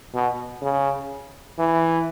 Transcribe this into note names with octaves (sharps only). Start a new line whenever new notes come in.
B2
C#3
E3